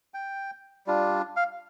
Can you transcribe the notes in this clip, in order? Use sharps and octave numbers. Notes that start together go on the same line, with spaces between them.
G5
G3 D4 F4
F5